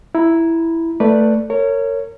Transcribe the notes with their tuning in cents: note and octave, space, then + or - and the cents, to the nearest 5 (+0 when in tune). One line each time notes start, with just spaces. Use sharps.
E4 +0 A#5 +20
A3 +10 B4 -10 D5 +0
A#4 -30 C#5 +0